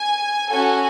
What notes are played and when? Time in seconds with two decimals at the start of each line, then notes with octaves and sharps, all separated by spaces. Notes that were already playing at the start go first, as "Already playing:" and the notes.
Already playing: G#5
0.49 C#4 F#4 A4 G#5